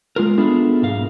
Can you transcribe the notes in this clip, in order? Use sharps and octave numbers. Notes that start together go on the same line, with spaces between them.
G#3 F4 A#4
B3 D4 E4 F4 G#4 A4
B1 G#2 A#4 F5